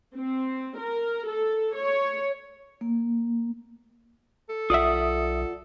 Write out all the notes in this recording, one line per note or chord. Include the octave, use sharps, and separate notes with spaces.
C4
A#4
A4
C#5
A#3
A4
B1 F4 D5 E5 F#5 D#6